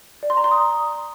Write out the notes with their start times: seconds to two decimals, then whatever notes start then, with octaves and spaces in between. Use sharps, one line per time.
0.23 D5
0.30 C6
0.37 A#5
0.44 C6
0.51 D#6